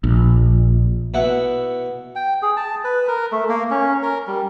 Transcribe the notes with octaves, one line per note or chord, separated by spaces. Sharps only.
A#1
B2 E4 F#5
G5
G#4
A5
B4
A#4
A3
A#3
C#4
A#4
G3